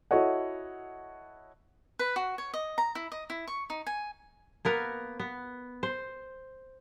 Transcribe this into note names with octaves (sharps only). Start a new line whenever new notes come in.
E4 F#4 A4 C#5 D#5 F#5
B4
F#4
C#5
D#5
A#5
E4
D#5
E4
C#6
D#4
G#5
A#3 B3 A#4
B3
C5